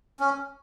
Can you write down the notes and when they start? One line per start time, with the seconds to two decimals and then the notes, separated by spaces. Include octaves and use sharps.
0.20 C#4